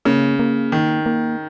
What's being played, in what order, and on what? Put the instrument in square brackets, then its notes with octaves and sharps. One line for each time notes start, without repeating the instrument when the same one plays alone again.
[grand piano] C#3 [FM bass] A#3
[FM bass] A#3
[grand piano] D#3
[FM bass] A#3